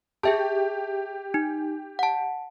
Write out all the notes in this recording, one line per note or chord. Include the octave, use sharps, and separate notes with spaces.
G4 G#4 E5 A5
D#4
F#5 A5